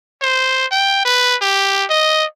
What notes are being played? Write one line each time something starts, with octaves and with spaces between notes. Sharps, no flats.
C5
G5
B4
G4
D#5